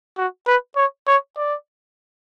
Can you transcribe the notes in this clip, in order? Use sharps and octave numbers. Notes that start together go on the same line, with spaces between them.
F#4
B4
C#5
C#5
D5